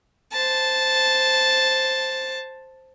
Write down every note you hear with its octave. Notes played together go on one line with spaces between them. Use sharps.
C5 A5